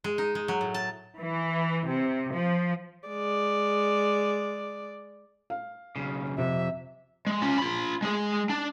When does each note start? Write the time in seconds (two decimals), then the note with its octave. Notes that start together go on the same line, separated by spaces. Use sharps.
0.04 G#3
0.18 D#4
0.35 G#3
0.48 F#3
0.61 A2
0.74 A5
1.18 E3
1.87 C3
2.33 F3
3.08 G#3 D5
5.50 F5
5.96 B1 G2 C#3
6.38 F2 C3 E5
7.27 G#3
7.42 C#4 F4
7.58 F4 B5
8.02 G#3 G#4
8.50 D4